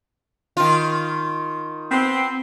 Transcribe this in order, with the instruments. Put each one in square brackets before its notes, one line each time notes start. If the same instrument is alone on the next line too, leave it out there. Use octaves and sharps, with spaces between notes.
[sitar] D#3 F4
[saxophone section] B3 C4